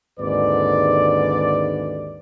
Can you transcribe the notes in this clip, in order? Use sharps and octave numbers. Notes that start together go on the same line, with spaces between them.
G#1 D#2 G#2 D3 B4 D5